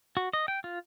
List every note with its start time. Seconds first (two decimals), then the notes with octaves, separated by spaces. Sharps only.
0.17 F#4
0.33 D#5
0.48 G5
0.64 F4